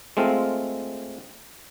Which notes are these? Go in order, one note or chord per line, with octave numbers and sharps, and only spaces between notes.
G#3 A3 C4 F4